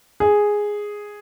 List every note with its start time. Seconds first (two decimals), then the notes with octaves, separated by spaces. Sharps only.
0.20 G#4